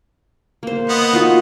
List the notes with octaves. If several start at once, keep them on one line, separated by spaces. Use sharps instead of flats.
A#3 C5
B3 D#5
D#4 F4 F#4